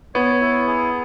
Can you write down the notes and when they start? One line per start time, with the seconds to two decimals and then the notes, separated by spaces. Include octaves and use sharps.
0.15 B3 C#5
0.41 E4
0.67 G#4